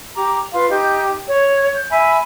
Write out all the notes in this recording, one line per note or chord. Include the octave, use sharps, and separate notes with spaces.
G4 A#5 D6
F4 B4 F5 C6
D#4 G4 G6
C#5
G6
E5 G#5 B5